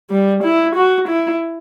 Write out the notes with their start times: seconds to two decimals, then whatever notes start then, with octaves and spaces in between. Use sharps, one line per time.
0.10 G3
0.44 E4
0.76 F#4
1.09 E4